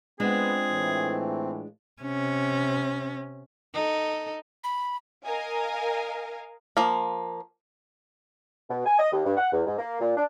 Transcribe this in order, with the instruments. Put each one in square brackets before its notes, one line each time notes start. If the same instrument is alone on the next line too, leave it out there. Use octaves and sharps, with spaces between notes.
[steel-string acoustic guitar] G#3 D4 F4 [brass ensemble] B3 [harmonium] C4 [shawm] G#4
[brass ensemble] A2 E3
[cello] C3 C#4
[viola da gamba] D#4 A4
[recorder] B5
[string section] A#4 D#5 F5 G#5
[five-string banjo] F3 A#3
[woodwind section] B2
G#5
D#5
D#2
G2
F#5
E2
G#2
A#3
A#2
D4